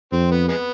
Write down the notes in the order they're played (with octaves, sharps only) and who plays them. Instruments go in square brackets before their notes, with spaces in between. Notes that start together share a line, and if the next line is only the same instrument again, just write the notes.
[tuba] F2 [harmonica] C4
[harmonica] B3
G#3 B3